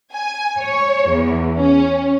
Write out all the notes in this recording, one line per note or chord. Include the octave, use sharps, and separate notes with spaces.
G#5
C#5
E2
C#4